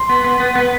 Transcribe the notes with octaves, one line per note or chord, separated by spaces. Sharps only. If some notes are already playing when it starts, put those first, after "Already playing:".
Already playing: C6
B3
B3
B3
B3